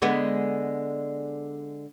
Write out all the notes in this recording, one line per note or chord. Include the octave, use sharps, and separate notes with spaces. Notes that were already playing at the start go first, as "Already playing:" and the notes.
D3 G#3 B3